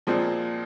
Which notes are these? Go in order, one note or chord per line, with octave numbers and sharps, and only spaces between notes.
A#2 F3 G#3 C4